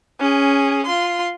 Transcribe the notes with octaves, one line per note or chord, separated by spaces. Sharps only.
C#4 G#4
F4 C6